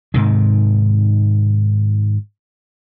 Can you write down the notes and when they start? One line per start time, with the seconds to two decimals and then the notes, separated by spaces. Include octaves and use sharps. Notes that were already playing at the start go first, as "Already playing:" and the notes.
0.14 G#2 C3 D#3